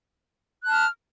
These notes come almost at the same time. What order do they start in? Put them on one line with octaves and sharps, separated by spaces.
F#6 A5 F6